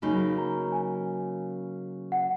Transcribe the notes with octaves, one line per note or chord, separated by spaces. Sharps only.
C#3 F#3 A#3 D#4 B5
A#5
G#5
F#5